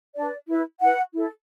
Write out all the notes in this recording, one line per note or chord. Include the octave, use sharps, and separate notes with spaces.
D4 B4 D5
E4 B4
E4 B4 F#5
E4 A4